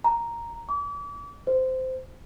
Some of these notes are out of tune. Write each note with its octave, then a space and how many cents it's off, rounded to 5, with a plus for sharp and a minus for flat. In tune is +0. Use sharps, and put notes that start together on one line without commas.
A#5 +0
D6 -40
C5 -15